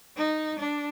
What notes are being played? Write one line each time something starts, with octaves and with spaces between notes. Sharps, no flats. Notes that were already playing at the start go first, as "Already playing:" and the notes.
D#4
D4